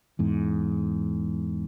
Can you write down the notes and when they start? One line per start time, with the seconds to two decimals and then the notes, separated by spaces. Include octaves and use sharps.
0.19 E2 G#2